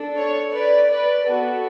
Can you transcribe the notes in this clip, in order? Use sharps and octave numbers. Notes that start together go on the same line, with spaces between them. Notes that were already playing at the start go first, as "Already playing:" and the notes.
Already playing: D4 A4
C#5
B4 D5
B4 D5
B3 F#4 A4